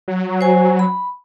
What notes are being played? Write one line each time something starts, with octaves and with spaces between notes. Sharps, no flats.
F#3
C5 G#5
B5